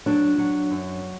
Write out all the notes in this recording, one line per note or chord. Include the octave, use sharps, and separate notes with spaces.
F#3 D4
F#3
F#2